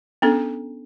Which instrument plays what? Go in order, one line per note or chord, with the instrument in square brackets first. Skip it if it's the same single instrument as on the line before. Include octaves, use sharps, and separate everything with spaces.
[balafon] B3 C#4 D4 A4